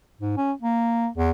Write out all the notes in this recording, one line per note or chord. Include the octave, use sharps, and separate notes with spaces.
G#2
C#4
A#3
E2